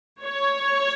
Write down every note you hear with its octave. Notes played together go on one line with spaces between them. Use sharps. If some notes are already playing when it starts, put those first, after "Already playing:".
C#5